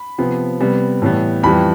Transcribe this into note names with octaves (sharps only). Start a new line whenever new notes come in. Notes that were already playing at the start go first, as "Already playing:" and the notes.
Already playing: B5
C3 F3 B3
C3 G3 B3
A2 E3 G3 B3
F2 E3 G3 B5